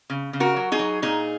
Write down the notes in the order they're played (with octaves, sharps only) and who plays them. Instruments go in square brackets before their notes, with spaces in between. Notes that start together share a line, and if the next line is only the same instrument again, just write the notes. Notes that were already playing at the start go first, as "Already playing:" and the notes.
[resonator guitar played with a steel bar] C#3
C#3
F#4 A#4
F#3
D#4 G#4
F#3
A#2 D#4 G#4